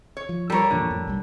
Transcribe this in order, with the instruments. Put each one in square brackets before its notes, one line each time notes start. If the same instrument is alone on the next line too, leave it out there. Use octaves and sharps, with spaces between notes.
[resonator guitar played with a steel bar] C#5
[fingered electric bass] F3
[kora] G3 C#5 [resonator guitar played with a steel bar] A4 A#4
[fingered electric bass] E2 A#2 F3 [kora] D3
[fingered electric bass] F2 A2
B1 G3